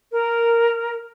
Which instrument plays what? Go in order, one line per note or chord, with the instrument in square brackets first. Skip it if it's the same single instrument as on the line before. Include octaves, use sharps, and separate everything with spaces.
[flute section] A#4